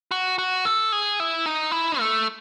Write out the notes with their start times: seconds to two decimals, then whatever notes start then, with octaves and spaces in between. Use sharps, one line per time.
0.11 F#4
0.38 F#4
0.65 A4
0.92 G#4
1.20 E4
1.46 D#4
1.72 E4
1.99 A3